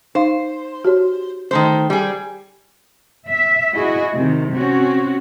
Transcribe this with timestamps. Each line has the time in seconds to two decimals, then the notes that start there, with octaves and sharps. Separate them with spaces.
0.15 D#4 C5 F5
0.85 F#4 G4 C#5
1.51 D#3 A3 C5
1.90 G3 G#4
3.29 E5
3.73 E4 F#4 G#4 D#5
4.15 C3 D#3
4.52 C4 C#4 F#4